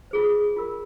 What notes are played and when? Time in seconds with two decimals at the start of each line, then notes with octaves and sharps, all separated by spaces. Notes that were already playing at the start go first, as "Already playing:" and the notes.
0.11 F4 G#4 C5
0.56 F4 A#4